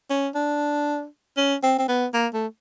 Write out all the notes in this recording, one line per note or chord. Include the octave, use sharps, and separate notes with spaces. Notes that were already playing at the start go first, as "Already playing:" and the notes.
C#4
D4
C#4
C4
C4
B3
A#3
A3